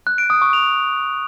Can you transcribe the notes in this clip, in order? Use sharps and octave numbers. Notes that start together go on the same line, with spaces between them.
F#6
D7
D#6
C#6
F7